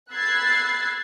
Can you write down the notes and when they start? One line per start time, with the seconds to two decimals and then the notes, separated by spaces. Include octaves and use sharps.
0.12 B5 E6 F#6 G#6 A6 C7